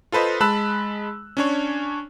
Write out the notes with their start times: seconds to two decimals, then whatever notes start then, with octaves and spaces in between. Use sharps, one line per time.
0.12 F4 A4 B4 C5 D#5
0.40 G#3 A5 B5 E6 F#6
1.37 C#4 D4 C#5